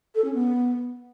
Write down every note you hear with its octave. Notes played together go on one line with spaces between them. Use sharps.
A4
C#4
B3